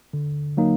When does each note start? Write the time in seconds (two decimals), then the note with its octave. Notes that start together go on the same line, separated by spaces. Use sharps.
0.13 D3
0.57 F#3 A#3 D#4